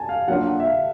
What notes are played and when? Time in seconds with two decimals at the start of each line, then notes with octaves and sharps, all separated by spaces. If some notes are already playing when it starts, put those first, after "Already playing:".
Already playing: G#5 A5
0.09 F5
0.28 F#3 A#3 D4 F4 F#5
0.47 F#5
0.60 E5
0.65 F5